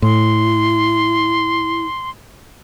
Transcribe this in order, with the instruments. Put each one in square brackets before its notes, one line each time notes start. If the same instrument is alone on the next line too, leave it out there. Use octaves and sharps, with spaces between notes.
[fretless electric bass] A2 [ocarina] E4 [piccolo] C6